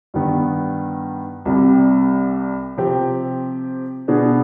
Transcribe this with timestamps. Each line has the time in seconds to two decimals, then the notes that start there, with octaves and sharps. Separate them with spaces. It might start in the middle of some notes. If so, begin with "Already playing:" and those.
0.14 G2 D#3 B3
1.45 C2 C3 G3
2.77 C3 F3 C4 G4
4.08 B2 B3 D4 G#4